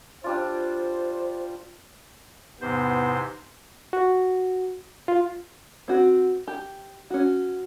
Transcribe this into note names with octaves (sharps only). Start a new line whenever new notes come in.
G3 D4 F4 C5
E2 G#2 C3 B3 C5
F#4
F4
C4 F#4
G4
C#4 F#4